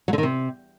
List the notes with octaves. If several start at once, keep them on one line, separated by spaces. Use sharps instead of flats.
F#3
D3
D#3
C3